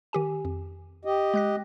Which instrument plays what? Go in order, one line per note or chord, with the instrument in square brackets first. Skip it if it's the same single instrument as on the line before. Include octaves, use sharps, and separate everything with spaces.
[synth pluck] D#3 G4 G#5
F2
[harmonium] G4 D#5
[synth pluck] G#3 F#6 A#6